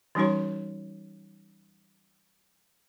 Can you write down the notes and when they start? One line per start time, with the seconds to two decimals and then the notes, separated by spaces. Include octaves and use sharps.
0.15 E3 G3 C#4 D#4 F#4 C#5